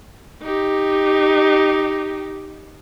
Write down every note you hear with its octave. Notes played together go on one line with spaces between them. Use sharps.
D#4 G4